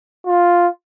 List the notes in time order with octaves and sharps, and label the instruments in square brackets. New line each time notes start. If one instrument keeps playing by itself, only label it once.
[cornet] F4